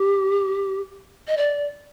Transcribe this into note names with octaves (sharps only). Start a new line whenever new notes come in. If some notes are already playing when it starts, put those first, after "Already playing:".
Already playing: G4
D#5
D5